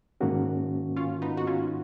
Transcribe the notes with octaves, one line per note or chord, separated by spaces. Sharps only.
G#2 D#3 A#3 C#4 F#4
C#4 F4
B3 D#4
F#4
C#4 F4